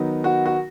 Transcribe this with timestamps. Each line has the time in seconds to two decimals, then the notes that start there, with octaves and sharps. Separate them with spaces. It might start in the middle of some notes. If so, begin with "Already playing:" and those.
Already playing: D#3 F#3 B3 D#4
0.24 F#4
0.46 F#4